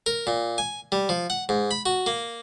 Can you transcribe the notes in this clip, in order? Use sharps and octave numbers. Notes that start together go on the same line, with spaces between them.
A#4
A#2
G#5
G3
F3
F#5
G#2
B5
F#4
A#3